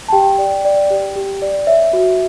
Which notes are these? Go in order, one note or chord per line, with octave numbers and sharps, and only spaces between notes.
A5
G4 G5
D5
D5
G4
G4
D5
C#5 E5
F#4